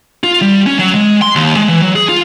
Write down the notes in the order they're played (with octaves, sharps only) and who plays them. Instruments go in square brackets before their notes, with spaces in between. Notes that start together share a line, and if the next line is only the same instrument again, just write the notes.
[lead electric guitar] F4
G3
C#4
F#3
G#3
C6
D#2
G#3
E3
F#3
G#4
F4